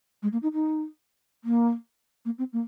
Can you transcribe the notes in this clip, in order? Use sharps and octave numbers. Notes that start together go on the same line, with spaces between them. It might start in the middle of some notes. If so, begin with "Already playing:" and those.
G#3
A#3
D#4
D#4
A#3
A#3
C4
A#3